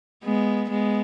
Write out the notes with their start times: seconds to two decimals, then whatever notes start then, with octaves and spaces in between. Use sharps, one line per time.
0.24 G#3 B3
0.70 G#3 B3